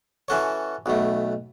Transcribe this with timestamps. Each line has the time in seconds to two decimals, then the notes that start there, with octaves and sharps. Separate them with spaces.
0.28 E3 C#4 F#4 A4 C#5
0.86 B1 B2 A3